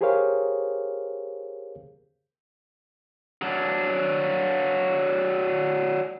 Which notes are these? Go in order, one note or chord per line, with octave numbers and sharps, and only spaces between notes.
G4 G#4 A#4 C5 C#5 F5
F#3 D4